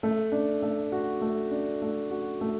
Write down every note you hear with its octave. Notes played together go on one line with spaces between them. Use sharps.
A3
D4
A3
F#4
A3
D4
A3
F#4
A3